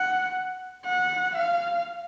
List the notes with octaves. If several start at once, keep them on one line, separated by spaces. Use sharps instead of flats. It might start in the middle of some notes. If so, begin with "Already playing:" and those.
Already playing: F#5
F#5
F5